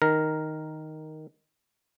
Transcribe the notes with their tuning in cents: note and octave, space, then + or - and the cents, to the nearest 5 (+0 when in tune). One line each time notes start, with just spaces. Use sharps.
D#3 +0 A#4 +0